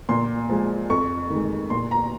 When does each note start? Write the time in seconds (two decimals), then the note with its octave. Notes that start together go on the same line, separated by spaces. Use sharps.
0.09 A#2 C6
0.49 F3 G#3
0.90 F2 C#6
1.30 D#3 G#3
1.70 A#2 C6
1.91 A#5